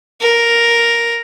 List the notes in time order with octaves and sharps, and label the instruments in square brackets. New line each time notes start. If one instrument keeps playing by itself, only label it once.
[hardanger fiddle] A#4